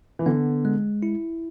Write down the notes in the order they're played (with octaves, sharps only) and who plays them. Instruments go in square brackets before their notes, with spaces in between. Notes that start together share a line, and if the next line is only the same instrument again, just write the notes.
[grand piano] E3
[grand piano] D3 [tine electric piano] B3
[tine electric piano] G#3
E4